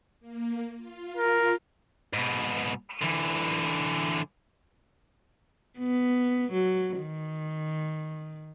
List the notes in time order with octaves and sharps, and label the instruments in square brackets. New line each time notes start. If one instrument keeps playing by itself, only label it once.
[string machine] A#3
F4
[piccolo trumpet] A#4
[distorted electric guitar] G#2 B2
D3 E3
[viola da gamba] B3
F#3
D#3